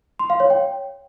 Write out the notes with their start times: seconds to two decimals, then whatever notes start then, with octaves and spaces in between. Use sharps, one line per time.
0.19 C6
0.30 F5
0.40 C#5
0.50 G5